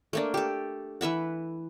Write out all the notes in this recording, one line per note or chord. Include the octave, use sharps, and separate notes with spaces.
A3 A#3 D4
G4 A4
E3 B4 E5 F#5